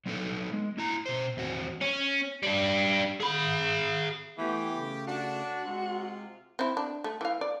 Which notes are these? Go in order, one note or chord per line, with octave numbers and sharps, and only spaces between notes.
F#3 B3 D#4 A4 B4
G#3
A#3 E4 A#5
B2 C5
E2 C4 F#4
C#4
G3 D4
G#4 B5
E3 A3 B3 G4
C#3 A3
D4 F#4
C3 G#3 F4
C4 E4
D4
A3
E3 F5
D5